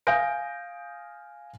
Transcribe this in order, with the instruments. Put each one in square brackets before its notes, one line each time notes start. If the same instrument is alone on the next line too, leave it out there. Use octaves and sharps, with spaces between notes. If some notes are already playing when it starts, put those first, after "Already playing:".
[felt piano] F5 G#5 D#6 G6 A#6 D7